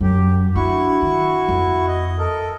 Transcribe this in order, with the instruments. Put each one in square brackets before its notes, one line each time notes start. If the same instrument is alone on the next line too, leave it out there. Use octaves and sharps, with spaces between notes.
[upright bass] F#2 [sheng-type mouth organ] G4
[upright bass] D4 [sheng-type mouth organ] E4 F#4 C#6
[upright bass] D#3
F2
[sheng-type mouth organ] D#5
A4 A#4 D#5